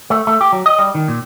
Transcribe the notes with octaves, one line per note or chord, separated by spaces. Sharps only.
A3
A3
G4
F#3
D#5
G3
D#3
A#2